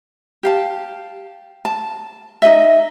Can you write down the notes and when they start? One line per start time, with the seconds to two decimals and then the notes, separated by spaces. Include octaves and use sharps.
0.43 G4 F5 A5
1.65 A5
2.42 D#4 G#4 D#5 E5